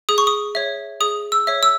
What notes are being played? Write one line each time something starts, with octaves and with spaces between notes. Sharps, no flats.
G#4 D#6
C#6
D#6
C#5 E5
G#4 D#6
E6
C#5 E5
E6